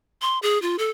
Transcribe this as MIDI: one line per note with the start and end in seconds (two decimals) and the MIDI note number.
0.22 0.39 84
0.42 0.60 68
0.62 0.76 65
0.79 0.89 69